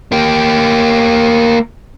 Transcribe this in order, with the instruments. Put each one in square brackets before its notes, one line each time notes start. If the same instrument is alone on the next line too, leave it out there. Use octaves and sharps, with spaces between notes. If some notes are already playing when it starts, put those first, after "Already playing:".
[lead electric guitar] A#3 G4